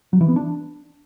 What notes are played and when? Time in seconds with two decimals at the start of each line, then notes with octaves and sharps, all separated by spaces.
0.13 F#3
0.21 E3
0.28 B3
0.36 D4